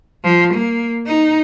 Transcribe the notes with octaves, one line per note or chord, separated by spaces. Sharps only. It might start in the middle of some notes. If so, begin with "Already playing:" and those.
F3
A#3
D#4